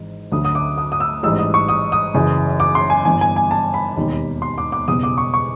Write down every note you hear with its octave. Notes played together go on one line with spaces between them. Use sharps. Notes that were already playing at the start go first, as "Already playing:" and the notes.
Already playing: G#1 G#2 E3
D2 D3 F#3 D#6
D#6
D6
D#6
D#6
E6
A1 G#2 E3 G3 E6
D#6
C#6
D#6
D#6
F#1 F#2 C#3 E3
D6
C6
G#5
G1 G2 E3 G#5
G#5
G#5
A5
B5
E1 D#2 D#3 G3
C6
D6
D6
F#1 E2 B2 G3 D#6
D6
C#6
C#6